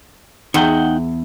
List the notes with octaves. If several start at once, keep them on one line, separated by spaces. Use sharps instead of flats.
E2 D#4 F#5 G5